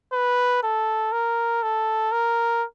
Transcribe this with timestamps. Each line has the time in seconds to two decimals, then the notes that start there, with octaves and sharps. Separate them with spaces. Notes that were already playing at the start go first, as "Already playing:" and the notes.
0.13 B4
0.63 A4
1.12 A#4
1.62 A4
2.12 A#4